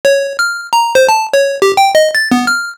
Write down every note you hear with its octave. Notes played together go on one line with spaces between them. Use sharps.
C#5
F6
A#5
C5
A5
C#5
G4
G5
D#5
A6
B3
F6